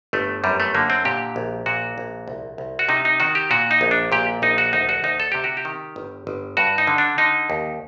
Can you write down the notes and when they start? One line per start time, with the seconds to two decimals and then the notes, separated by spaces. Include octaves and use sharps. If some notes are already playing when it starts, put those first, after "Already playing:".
0.13 G1 A3
0.44 F#2 G3
0.60 A3
0.75 D3 A#3
0.90 C4
1.05 A#2 G4
1.36 A#1
1.66 A#2 F#4
1.98 A#1
2.28 C2
2.58 C2
2.79 F#4
2.89 C3 D#4
3.05 D#4
3.20 D#3 F#4
3.35 G4
3.50 A#2 F#4
3.71 D#4
3.81 A#1
3.91 D4
4.12 A#2 G4
4.42 A#1 D#4
4.58 F#4
4.73 D2 D#4
4.89 F#4
5.04 D2 D#4
5.20 A4
5.32 C3 G4
5.44 F#4
5.57 G4
5.65 D#3
5.96 G1
6.27 G1
6.57 G2 F#4
6.78 D#4
6.87 D3
6.98 D4
7.18 D3 D#4
7.50 D#2